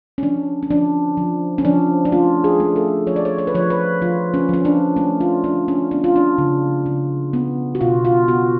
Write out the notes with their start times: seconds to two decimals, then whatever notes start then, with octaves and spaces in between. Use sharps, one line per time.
0.18 C#4
0.23 F3 D4
0.63 C#4
0.70 F3 D4
1.17 F3
1.58 C#4
1.65 F3 D4
2.05 D4
2.12 A3 F4
2.44 G#4
2.60 A3
2.76 A4
3.07 F3 C#5
3.16 D5
3.25 C#5
3.38 C#5
3.47 B4
3.55 F3 C#5
3.70 B4
4.02 F3 F4
4.34 C#4
4.49 F3 C#4
4.65 D4
4.96 A3 C#4
5.21 F4
5.44 F3 D4
5.68 C#4
5.91 B3 D4
6.04 F4
6.16 D4
6.38 C#3
6.86 C#3
7.33 B3
7.75 F#4
7.81 B2 F4
8.05 F4
8.28 B3 F#4